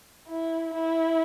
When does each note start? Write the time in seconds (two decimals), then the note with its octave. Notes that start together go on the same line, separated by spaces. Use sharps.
0.28 E4
0.74 E4